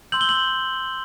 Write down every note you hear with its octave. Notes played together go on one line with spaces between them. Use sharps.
C6 E6 G6 F#7
G7
F#7